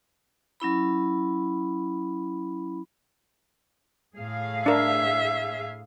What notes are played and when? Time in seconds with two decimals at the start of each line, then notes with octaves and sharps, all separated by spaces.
0.60 F#3 C#4 E4 B5
4.16 A2 G#4 F5
4.66 D4 A#4 E5